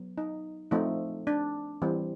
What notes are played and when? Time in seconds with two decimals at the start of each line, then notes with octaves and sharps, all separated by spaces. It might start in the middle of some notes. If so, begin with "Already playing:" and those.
Already playing: F#3 B3
0.18 D#4
0.71 F3 A3 C4 D#4
1.27 D4
1.82 E3 G3 C4